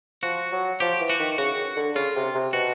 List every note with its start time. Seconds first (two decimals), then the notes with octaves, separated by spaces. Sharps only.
0.23 F3 F#4
0.52 F#3
0.80 F3 G4
1.00 E3
1.10 F#4
1.19 D#3
1.38 C#3 F#4
1.77 D3
1.95 C#3 F4
2.15 C3
2.35 C3
2.53 B2 F#4